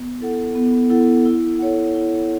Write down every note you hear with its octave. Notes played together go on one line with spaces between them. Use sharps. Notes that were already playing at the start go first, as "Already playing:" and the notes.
Already playing: B3
E4 A4 F#5
B3
E4 A4 F#5
E4
A4 C#5 F#5
E4